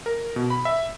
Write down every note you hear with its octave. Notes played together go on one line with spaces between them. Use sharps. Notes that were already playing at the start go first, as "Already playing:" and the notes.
A#4
B2
B5
E5